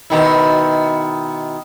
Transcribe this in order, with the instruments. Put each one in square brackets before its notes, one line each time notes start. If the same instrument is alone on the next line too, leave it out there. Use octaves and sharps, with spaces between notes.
[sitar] B2 D#3 E4